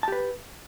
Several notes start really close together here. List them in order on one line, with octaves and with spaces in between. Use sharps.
A5 G4 B4